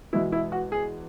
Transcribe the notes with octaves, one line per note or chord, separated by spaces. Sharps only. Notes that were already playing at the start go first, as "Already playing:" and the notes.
E2 B2 G#3 E4
E4
F#4
G#4